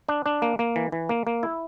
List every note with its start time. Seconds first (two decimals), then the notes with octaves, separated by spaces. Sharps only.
0.09 D4
0.26 D4
0.42 A#3
0.59 A#3
0.76 E3
0.92 E3
1.09 A#3
1.27 A#3
1.43 E4